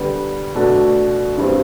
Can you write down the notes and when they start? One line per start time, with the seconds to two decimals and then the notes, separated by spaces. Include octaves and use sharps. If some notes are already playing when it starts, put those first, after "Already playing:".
Already playing: D3 G3 B3
0.55 B2 A3 D4 F#4
1.37 G2 E3 G3 C4